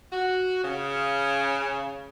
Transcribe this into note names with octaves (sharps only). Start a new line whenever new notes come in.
F#4
C#3